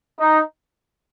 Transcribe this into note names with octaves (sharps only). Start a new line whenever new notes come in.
D#4